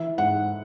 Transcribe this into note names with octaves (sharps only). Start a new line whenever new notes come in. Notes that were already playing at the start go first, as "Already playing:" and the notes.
Already playing: E3 E5
G#2 F#5